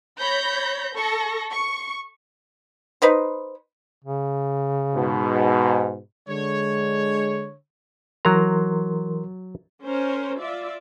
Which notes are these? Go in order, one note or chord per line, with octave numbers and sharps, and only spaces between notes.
C#5 B5 G6 A#6
A4 C#6 A#6
C#6
D#4 B4 C5
C#3
G#2 B2
D3 G#3 C#5
E3 F#3 A#4 A#5 C6
C#4 A#4 C5
F4 D5 E5